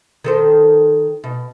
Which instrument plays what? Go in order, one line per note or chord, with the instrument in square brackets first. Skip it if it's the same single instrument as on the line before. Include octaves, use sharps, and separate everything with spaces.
[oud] D#3 A4 C5
B2